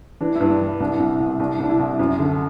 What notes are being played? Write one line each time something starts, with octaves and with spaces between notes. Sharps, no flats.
E3 D4
G2 E4
D4
E3
C2 D4
C2
C2
C2 D4
C2 D4
E4
C2
F#2
D3